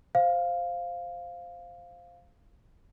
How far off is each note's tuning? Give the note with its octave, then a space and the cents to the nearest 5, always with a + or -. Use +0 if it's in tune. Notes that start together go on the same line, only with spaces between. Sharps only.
C5 +0 F5 +0